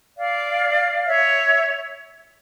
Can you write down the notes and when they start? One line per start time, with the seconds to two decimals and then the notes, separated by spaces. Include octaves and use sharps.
0.18 D5 F5
1.05 C#5 E5